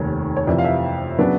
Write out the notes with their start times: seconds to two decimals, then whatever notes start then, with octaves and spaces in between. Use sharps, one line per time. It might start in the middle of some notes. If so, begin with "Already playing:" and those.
Already playing: F1 D#2 D#3 C#5
0.36 C#5
0.47 F2 C3 E3 D5
0.58 F5
0.64 E5
1.19 C#3 F#3 B3 D4